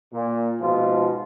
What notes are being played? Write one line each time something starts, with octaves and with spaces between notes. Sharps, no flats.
A#2
G#2 B2 F3 F4